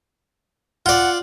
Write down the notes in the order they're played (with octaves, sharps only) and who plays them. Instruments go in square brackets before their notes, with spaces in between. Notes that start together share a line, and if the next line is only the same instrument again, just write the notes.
[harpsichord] F4 D5 [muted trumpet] F#5